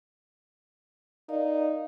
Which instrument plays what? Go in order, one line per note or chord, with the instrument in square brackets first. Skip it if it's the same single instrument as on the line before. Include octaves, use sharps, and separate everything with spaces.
[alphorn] D#4 [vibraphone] A#4 D5 F5